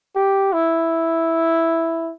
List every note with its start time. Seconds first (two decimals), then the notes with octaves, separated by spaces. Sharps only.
0.15 G4
0.53 E4